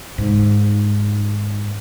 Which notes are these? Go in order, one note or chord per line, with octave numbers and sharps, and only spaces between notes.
G#2 D#3